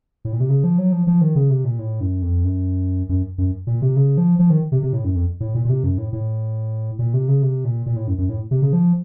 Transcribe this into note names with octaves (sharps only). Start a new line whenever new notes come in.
A2
A#2
C3
C#3
F3
F#3
F3
F3
D#3
C#3
C3
A#2
A2
F#2
F2
F#2
F#2
F#2
A#2
C3
C#3
F3
F3
D#3
C3
C3
A2
F#2
F2
A2
A#2
A#2
C3
F#2
A2
A2
A#2
C3
C#3
C3
A#2
A#2
A2
F#2
F#2
A2
C3
C#3
F3